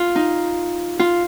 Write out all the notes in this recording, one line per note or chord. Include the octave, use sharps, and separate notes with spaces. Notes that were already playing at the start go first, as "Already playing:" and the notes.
Already playing: F4
D#4
F4